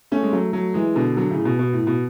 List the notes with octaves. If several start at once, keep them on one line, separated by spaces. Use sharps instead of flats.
A3 C#4
G#3
F#3 A3
F#3 A3
E3 G#3
B2 D3
D3 F#3
A2 C#3
B2
B2
A2
B2